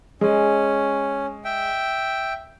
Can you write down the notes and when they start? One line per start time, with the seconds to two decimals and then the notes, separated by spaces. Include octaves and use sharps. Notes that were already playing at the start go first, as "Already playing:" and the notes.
0.21 G#3 C#4
1.45 E5 G5